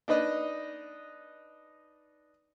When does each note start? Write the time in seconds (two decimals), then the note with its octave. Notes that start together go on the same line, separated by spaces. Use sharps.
0.08 D4 D#4 B4 D#5